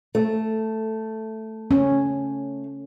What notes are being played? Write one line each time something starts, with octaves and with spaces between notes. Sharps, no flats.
A3
C#4